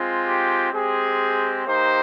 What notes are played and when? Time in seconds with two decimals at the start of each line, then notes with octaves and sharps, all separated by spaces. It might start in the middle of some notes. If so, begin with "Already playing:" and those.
Already playing: G#3 C4 F4
0.25 G4
0.72 G#3 C4 G4 G#4
1.66 A#3 D#4 G4 C5